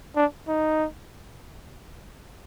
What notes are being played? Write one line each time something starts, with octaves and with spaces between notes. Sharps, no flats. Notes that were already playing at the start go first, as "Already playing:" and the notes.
D4
D#4